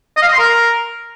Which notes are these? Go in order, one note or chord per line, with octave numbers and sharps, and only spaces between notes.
D#5
F5
D#5
C6
A#4